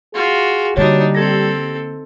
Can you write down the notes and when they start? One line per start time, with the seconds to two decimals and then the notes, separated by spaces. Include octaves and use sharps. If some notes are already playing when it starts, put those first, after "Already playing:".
0.14 F4 F#4 G#4
0.77 D3 G3 A#3 D4 D#4 F#4 C#5
1.15 C4 G4 A4 G#6 A#6